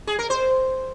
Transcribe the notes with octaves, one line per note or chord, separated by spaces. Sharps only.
G#4
A#4
C5